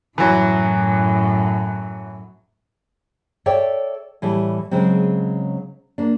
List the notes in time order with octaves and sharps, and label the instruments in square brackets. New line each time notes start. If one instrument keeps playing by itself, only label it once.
[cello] F#2 A2 [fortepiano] E3 F#3
[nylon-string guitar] A4 C#5 D5 E5 G5
A2 E3 G3 A3
C#3 F#3 G#3 C4
A#3 D4